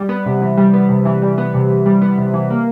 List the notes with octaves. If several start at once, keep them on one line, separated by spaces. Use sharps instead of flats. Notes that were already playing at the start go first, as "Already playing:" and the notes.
Already playing: G3
B3
C3
E3
G3
B3
C3
E3
G3
B3
C3
E3
G3
B3
C3
E3
A#3